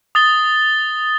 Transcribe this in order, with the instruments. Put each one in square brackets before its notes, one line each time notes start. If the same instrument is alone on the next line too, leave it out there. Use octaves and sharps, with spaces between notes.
[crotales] D#6 A6 G7